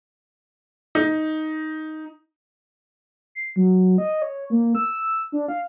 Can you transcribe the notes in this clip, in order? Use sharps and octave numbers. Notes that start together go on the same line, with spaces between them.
D#4
C7
F#3
D#5
C#5
A#3
E6
D4
F5